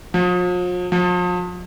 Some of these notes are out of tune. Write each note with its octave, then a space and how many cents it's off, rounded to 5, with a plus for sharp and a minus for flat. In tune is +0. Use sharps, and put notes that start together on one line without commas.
F3 +45
F3 +40